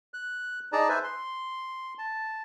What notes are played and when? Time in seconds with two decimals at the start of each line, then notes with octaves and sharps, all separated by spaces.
0.14 F#6
0.72 D#4 G#4 D5 A5 A#5
0.89 B4 C5 E5 G#5
1.03 C6
1.99 A5